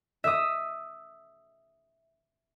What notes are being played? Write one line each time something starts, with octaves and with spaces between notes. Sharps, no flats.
E5 D#6